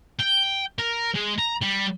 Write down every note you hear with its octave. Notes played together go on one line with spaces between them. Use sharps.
G5
A#4
G#3
A#5
G3